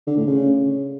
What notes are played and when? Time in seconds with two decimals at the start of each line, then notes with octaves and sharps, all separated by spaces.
0.07 D3
0.17 A2
0.27 C#3